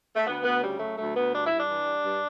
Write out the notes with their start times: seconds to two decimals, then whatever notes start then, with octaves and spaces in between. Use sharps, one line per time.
0.15 A3
0.26 D2 B3
0.43 D2 B3
0.61 C#3 G3
0.79 F#3 A3
0.97 D2 A3
1.14 D2 B3
1.32 G2 D4
1.46 G2 E4
1.60 D4
1.68 E3
1.85 G3
2.03 G2